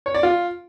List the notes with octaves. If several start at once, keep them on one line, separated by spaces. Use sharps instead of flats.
C#5
D5
F4